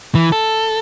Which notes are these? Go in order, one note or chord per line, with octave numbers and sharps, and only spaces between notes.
E3
A4